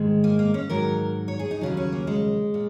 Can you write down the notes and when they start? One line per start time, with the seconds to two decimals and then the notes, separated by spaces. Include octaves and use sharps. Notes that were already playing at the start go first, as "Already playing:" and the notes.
Already playing: G#2 D#3 G#3
0.24 A#3
0.39 A#3
0.54 C#4
0.69 G#2 D#3 F#3 A#4
1.28 C#5
1.39 G#4
1.51 D#4
1.61 D#2 C#3 F#3
1.77 C#4
1.92 A#3
2.07 G#3
2.54 A#2